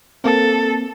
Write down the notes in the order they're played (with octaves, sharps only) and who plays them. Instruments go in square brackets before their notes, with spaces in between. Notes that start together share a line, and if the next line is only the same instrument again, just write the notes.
[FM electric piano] A#3 C4 [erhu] A4